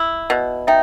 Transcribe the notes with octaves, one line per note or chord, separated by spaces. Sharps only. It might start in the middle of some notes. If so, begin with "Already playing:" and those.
Already playing: E4
B2
D#4 E5 G5